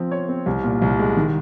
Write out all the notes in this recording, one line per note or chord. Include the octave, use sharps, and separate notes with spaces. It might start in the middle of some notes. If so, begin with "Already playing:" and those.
Already playing: F3 C4
C#5
C4
C2
A#2
C2
G#3
D#3